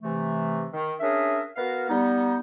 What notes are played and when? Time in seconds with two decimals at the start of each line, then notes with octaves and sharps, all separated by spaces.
0.02 C3 E3 A3
0.72 D#3
1.01 C#4 D4 G#4 A#4 E5
1.56 B3 F#4 A#4 F5
1.90 G3 B3 D#4